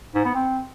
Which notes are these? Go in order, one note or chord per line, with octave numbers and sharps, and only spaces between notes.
G#2
B3
C4